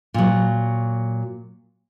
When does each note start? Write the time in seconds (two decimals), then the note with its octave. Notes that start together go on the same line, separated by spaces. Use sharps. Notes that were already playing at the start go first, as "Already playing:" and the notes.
0.14 A#2 F#3